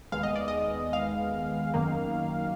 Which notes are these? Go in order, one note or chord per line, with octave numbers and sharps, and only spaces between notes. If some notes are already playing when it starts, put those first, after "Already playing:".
D#2 D#3 G#3 B3 F5
D#5
D5
D#5
F5
F#2 D#3 A#3